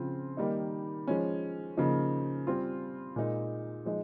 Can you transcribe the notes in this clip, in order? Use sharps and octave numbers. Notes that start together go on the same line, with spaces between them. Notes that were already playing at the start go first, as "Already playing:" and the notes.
Already playing: C#3 F3 C4 F4
D#3 G3 A#3 D#4
F3 G#3 C#4
C#3 F3 A#3 D#4
G3 C4 F4
A#2 G#3 D#4
F3 G#3 D#4